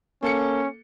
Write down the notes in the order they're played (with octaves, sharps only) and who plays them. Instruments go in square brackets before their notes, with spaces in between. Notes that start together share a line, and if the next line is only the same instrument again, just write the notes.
[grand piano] A#3 A4 C#7 [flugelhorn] C#4